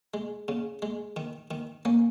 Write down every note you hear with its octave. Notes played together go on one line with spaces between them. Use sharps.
G#3
C#3
G#3
D#3
D#3
A#3 C#4